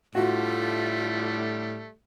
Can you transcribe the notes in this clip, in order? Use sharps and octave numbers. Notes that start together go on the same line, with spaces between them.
A2 D3 G3 A3 F4 F#4